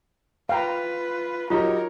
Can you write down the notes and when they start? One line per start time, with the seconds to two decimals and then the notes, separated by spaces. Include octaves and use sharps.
0.49 F4 B4 F5 G5 A#5
1.50 F#3 D#4 F4 G4 A#4 C#5